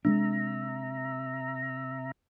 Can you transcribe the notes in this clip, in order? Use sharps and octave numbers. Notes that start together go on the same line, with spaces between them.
C3 G#3 B3 D4 E5 A#5